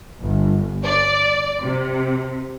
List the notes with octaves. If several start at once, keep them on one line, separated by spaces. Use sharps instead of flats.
G1
D5
C3